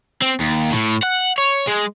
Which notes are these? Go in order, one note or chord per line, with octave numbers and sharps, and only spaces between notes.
C4
D#2
A2
F#5
C#5
G#3